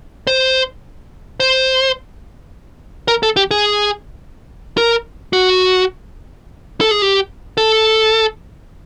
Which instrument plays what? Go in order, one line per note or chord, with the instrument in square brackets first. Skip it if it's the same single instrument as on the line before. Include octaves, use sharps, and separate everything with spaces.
[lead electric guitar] C5
C5
A#4
A4
G4
G#4
A#4
F#4
A4
G#4
G4
A4